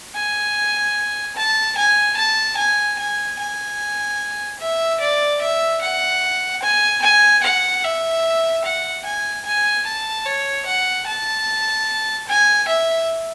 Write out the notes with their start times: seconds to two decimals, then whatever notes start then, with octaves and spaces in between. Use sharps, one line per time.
0.15 G#5
1.36 A5
1.77 G#5
2.17 A5
2.57 G#5
2.98 G#5
3.39 G#5
4.60 E5
5.00 D5
5.40 E5
5.81 F#5
6.62 G#5
7.02 G#5
7.43 F#5
7.83 E5
8.64 F#5
9.05 G#5
9.45 G#5
9.86 A5
10.25 C#5
10.66 F#5
11.06 A5
12.28 G#5
12.68 E5